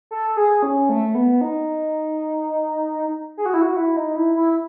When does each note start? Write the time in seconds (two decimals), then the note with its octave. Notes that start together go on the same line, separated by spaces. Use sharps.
0.11 A4
0.37 G#4
0.63 C#4
0.89 A3
1.15 B3
1.41 D#4
3.37 G#4
3.46 F#4
3.54 E4
3.62 F#4
3.76 E4
3.96 D#4
4.16 E4
4.35 E4